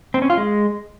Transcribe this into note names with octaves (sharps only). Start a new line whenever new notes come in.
C4
C#4
F4
G#3